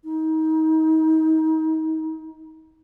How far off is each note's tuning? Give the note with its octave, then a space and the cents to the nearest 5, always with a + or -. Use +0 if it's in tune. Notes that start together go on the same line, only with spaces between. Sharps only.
D#4 +30